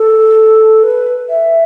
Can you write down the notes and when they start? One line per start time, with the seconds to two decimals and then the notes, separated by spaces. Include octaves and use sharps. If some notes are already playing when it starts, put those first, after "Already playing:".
Already playing: A4
0.83 B4
1.29 E5